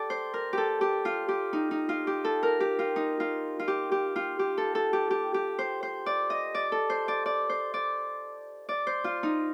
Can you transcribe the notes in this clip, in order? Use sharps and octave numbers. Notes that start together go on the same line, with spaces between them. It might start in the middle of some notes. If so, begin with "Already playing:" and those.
Already playing: G4 A4 D5
C5
A#4
G4 A4
G4
F4
G4
D#4
D#4
F4
G4
A4
A#4
G4
F4
D#4
F4
F4
G4
G4
F4
G4
A4
A4
G4
G4
G4
C5
C5
D5
D#5
D5
A4
C5
D5
D5
C5
D5
D5
C5
F4
D#4